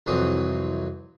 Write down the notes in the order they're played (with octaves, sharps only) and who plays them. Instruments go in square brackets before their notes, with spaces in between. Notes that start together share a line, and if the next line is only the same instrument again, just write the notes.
[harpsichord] C2 F2 E3 F#3 C4 D#6